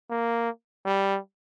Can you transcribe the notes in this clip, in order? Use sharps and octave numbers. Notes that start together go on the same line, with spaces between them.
A#3
G3